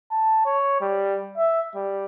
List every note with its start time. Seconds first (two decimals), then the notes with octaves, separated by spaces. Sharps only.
0.11 A5
0.45 C#5
0.81 G3
1.37 E5
1.75 G3